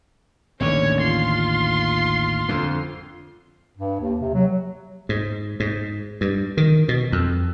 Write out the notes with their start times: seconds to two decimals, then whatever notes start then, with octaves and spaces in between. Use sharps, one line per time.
0.60 A1 D#2 D3 C#4 C#5
1.01 F4 C6
2.49 F2 D3
3.77 G2
4.00 D#2
4.20 C3
4.34 F#3
5.09 G#2
5.60 G#2
6.21 G2
6.57 D#3
6.88 B2
7.12 F2